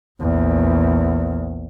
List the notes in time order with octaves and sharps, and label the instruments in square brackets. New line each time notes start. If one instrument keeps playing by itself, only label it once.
[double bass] A#1 E2